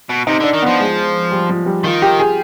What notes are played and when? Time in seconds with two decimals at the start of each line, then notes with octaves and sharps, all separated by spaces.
0.09 B2
0.27 C3 D#4
0.40 D3 D4
0.53 D#3
0.62 F3 B3
0.80 G#3
1.32 G3
1.49 F3
1.66 G3
1.84 D#3 F4
2.02 G4
2.19 G#4